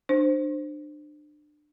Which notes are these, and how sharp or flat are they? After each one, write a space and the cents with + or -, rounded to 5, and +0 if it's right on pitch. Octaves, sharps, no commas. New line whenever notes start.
D4 +30 C5 +0